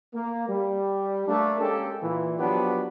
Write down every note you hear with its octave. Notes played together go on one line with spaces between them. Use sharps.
A#3
G3
A3 A#3 D4
G#3 A#3 C#4 G4 A4
A#2 E3
F3 F#3 B3 D4 G4 B4